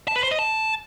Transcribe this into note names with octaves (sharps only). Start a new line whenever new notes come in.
A5
B4
C5
D#5
A5